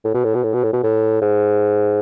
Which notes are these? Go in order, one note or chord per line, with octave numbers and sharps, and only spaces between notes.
A2
B2
A2
B2
A2
B2
A2
B2
A2
G#2